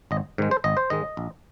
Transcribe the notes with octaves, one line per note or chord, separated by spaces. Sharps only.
G#1 D#5
G#2 D#3 G#3
C5
G#1 D#5
C5
G#2 D#3 G#3 D#5
A#1